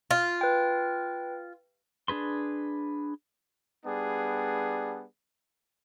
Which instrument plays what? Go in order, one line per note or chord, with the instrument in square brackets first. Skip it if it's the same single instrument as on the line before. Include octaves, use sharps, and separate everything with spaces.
[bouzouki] F4
[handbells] B4 G5
[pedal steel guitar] D4 G#4 B4 C6
[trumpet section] G3 B3 D4 G#4